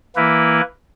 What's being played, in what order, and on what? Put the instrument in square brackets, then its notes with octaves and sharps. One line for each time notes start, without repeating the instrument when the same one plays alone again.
[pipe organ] E3 A#3 E4 B4